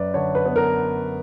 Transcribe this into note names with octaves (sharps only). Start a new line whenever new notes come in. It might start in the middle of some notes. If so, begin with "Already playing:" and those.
Already playing: F#2 F#3 B4 D5
D3 C#5
B4
B3
A#4